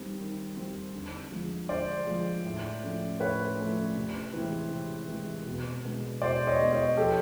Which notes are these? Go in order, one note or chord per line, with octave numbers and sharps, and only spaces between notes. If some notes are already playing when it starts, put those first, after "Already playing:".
Already playing: D#3 G3 C4
D#3
G3 C4
D3
F3 G#3
D3 C5 D5
F3 G#3
A2
F3 A3 C#4
A2 B4 C#5
F3 A3 C#4
C3
E3 G#3 C4
C3
E3 G#3 C4
B2
G#3 B3 D4
B2 C5 D5
C#5 D#5
G#3 B3 D4
C#5 D#5
F3 G4 A4